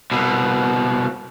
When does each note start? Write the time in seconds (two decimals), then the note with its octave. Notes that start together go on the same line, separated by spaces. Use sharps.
0.11 C2 B2